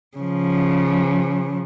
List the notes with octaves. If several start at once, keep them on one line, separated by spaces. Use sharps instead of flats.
C#3 F3